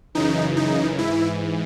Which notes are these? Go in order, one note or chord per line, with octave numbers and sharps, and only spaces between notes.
F#2 C#3 E3 D#4
D#4
G#2 E3 E4